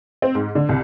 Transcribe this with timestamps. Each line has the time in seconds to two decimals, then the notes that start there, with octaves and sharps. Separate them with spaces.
0.22 C4
0.35 G#2
0.55 D3
0.69 C2